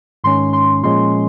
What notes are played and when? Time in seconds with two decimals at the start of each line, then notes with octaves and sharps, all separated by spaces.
0.24 G#2 D#3 G#3 C#4 C6
0.53 C6
0.83 A#2 F3 G#3 C#4 C6